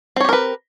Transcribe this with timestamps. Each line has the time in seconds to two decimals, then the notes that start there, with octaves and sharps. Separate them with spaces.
0.16 C4
0.20 C#5
0.25 G4
0.29 A#4
0.33 B4